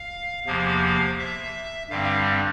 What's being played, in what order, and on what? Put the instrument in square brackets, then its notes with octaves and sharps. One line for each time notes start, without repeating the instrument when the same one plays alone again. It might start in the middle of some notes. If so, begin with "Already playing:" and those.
Already playing: [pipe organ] F5
E2 C3 F3 A#3 F5
E5
G2 D3 G3 C4 F5